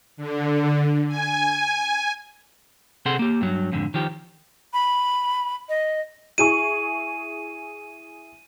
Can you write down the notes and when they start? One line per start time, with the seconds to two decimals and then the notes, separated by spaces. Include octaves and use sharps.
0.17 D3
1.08 G#5
3.06 C3 C4 G#4 A4 F#5 C6
3.19 A#3 G4
3.41 G2 F#3
3.72 F2 G#2 D3
3.94 D#3 F3 G4
4.73 B5
5.69 D#5
6.38 E4 G#4 C#6 D#7